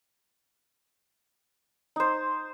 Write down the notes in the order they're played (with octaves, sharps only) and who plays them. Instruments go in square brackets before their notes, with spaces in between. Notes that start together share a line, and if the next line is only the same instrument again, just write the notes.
[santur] D#4 C5